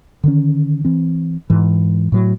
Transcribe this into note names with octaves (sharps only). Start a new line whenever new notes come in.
D3 D#3 C#4
E3 C4
G#2 E3
A2 F#3